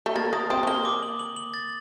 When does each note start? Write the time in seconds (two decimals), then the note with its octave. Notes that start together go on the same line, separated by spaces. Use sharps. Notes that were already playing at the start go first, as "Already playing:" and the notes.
0.06 A3
0.15 A#3 A6
0.33 A#3 D#6
0.50 C4 D#6
0.63 A3
0.67 A#3 G7
0.85 D6
1.03 F#7
1.19 F#7
1.36 F#7
1.54 A6